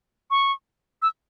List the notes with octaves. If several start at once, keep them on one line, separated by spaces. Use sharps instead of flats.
C#6
E6